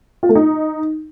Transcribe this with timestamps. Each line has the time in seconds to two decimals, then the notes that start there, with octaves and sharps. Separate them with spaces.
0.23 F4
0.29 A3
0.35 D#4